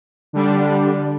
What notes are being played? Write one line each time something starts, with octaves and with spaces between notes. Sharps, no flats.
D3 G3 D4